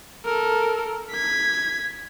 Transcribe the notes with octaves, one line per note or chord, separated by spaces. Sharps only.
A4 A#4
G#6 B6